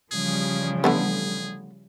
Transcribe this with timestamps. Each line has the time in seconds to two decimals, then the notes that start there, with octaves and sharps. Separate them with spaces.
0.12 C#3 E3 F3 G3 G#4
0.84 D3 A3 B3 G#4